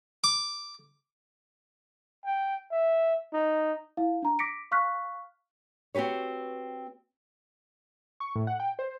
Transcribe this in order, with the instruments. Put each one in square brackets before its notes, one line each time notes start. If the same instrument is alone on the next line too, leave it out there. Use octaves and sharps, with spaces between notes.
[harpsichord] D6
[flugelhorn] G5
E5
D#4
[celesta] E4 F5
D4 A#5
D6 A#6 B6 C#7 D7
F5 C#6 F6 F#6 B6
[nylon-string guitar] C4 F#4 G4 B4 C#5
[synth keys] C#6
A2
F#5
G5
C5